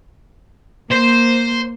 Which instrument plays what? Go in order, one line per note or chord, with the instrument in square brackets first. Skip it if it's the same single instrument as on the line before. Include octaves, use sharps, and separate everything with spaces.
[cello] A#3 [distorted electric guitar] C5